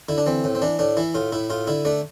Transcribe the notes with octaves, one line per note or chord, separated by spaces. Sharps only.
D3 E4
D4
E3 C4
A2
C4
E3 D4
A2 D4
E3 E4
A2 F4
A2 E4
A2 F4
D3 E4
A3 D4